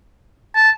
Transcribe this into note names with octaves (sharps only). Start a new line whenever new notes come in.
A5